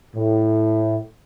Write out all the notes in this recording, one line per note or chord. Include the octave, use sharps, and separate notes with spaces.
A2